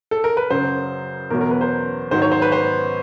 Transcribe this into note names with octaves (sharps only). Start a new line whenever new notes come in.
A4
A#4
B4
F#2 C#3 F#3 C5
E2 B2 F#3 A#4
A#4
B4
C5
G#2 D#3 F#3 C5
C#5
C5
B4
C5